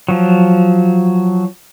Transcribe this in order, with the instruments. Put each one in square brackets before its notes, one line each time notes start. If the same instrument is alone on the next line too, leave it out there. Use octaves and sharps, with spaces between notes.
[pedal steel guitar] F3 F#3